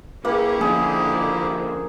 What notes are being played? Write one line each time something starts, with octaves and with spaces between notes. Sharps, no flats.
A#3 C#4 E4 G4 G#4 B4
D3 F3 A#3 C#4 G#4 D#5